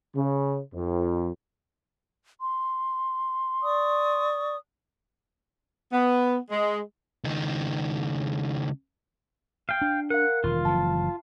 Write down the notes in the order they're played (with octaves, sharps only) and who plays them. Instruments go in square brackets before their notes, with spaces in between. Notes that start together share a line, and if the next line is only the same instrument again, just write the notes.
[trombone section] C#3
F2
[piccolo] C6
[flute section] D5 C#6 D#6
[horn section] B3
G#3
[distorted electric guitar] C#2 D#3
[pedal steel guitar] F5 G5
[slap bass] D4
[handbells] A#4 F5 [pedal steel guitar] F#5
[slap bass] E1 D#3 [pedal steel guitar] F4
[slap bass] F#1 E3 F3 [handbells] A5